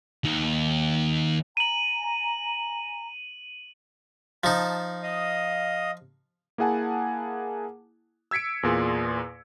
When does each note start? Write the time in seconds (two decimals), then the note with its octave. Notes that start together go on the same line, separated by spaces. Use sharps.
0.24 D#2 D#3
1.57 G#5 A#5 D#7 F#7
4.44 F3 D#4 A5
5.03 D#5 F5 D#6
6.58 A#3 E4 G#4 F#5 G#5 A5
8.31 E6 G#6 B6 C#7 D7
8.63 E2 A#2 G#4 C6